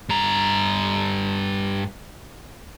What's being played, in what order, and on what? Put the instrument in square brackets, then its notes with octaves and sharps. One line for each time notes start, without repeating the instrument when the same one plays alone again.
[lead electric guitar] G2 A#5